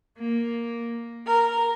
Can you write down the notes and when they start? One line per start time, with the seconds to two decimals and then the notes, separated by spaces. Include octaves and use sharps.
0.18 A#3
1.26 A#4